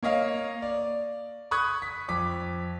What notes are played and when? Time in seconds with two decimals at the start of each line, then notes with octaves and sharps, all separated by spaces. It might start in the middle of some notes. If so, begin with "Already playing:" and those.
0.03 A#3 C#5 D#5 F5
0.62 D5
1.51 B5 C#6 D#6 F#6 G#6
1.82 B6
2.08 F2 D6 B6